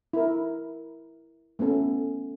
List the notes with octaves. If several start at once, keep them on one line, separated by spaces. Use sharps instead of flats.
E4 A#4
A3 B3 C#4 A4